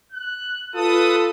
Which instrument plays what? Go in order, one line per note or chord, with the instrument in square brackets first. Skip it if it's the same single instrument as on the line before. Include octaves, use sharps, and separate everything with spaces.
[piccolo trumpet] F#6
[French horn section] F4 [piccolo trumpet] A4 [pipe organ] B4 D#6